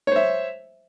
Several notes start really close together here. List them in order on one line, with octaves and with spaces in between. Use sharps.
C#5 C5 E5